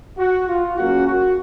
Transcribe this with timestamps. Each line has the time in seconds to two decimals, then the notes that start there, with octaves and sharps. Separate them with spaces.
0.18 F#4
0.48 F4
0.77 C#2 C#3 F#3 A#3 C#4 F#4
1.07 F#4